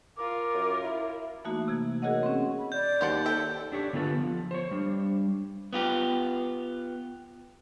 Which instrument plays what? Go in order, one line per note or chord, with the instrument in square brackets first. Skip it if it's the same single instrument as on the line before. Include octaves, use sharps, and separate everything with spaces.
[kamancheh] F4 A#4 [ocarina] D6
[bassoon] F#2
[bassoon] E4 [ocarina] E5
[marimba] E3 A3 A#3 D#4 F#4 E5
C3 G#6
F#4 G#4 A#4 C#5 D#5 F#5
C4 C#4
[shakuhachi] B5
[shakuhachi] D5 [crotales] G6
[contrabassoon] D#2 [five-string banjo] G4 C5 F#5
[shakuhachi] A4 [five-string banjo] E5 G5
[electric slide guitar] D4 G4 C#5
D3 B3 F4 A4 B4
F3
C5 C#5
G3 D4
[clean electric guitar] B3 F4 G4